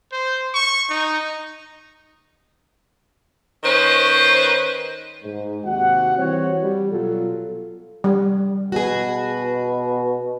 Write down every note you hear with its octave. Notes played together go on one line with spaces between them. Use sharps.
C5
C#6
D#4
D#3 C#4 B4 C5
G#2
D#2 C3 F#4 F#5
E3 G3 C4 F#4 C#5
G3
B2 F#3 F4 A4
G3
B2 F#4 G#4